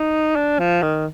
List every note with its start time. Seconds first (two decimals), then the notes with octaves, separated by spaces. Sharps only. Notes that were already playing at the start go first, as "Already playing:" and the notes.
Already playing: D#4
0.36 D4
0.59 F3
0.82 D#3